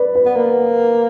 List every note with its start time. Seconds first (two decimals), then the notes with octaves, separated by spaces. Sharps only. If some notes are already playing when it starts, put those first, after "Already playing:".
Already playing: B4 D5
0.15 B4
0.26 B3
0.36 A#3